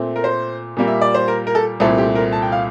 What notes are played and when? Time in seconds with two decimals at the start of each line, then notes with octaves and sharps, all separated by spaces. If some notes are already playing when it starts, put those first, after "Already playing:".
Already playing: A#2 A3 C4
0.16 A#4
0.24 C5
0.77 A#2 G3 A#3
0.87 E5
1.01 D5
1.14 C5
1.28 A#4
1.47 A#4
1.55 A4
1.80 C2 A#2 A3 C4 A4
1.98 G4
2.15 A#4
2.32 A5
2.42 G5
2.52 F5